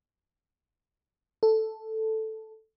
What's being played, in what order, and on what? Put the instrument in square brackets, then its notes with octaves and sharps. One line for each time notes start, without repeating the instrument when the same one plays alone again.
[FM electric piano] A4